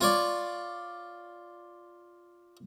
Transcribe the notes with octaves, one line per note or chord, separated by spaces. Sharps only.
F4 C#5 D5